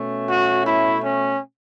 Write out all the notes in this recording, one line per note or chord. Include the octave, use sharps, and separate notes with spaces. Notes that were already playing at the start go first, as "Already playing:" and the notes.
Already playing: B2 A3 C#4
F#4
E4
C#4